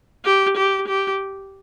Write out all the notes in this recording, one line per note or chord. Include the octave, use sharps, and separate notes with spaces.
G4
G4
G4